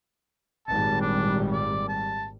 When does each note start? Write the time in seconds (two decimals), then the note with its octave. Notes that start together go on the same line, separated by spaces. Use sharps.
0.68 G#1 A#2 G3 A5
1.01 D4
1.52 D5
1.88 A5